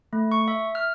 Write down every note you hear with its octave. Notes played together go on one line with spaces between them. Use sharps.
A3
C#6
E5
F6